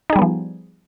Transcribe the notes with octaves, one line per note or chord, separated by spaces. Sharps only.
F3 G3 B3 D#4 G#4